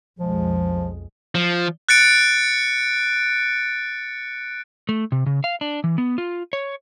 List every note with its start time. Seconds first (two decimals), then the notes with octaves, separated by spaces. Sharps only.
0.19 B1 F2 F3 G#3
1.35 F3
1.89 F#6 A6 C#7 D7
4.89 A3
5.12 C3
5.26 C#3
5.44 F5
5.61 D4
5.84 E3
5.98 B3
6.18 F4
6.53 C#5